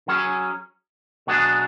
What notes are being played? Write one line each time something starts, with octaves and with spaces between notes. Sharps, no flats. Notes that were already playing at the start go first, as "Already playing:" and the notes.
F#3 C#4 G#4 C#5
B2 F#3 B3 D4 G#4